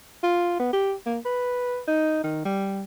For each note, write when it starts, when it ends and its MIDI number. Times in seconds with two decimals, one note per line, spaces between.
0.23 0.56 65
0.60 0.72 59
0.73 0.94 67
1.06 1.19 58
1.25 1.80 71
1.87 2.22 63
2.23 2.42 51
2.45 2.83 55